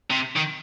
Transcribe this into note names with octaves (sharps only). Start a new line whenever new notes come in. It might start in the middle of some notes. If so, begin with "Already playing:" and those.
C3
D#3